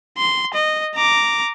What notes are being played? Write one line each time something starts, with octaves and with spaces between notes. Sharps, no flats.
C6
D#5
A#5 D6